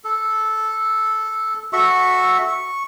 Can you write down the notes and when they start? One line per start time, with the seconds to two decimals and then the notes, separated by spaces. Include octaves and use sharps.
0.04 A4
1.73 F#4 A4 E5 C#6
2.48 C#6